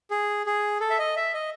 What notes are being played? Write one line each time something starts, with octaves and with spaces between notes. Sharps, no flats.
G#4
G#4
A4
E5
D#5
E5
D#5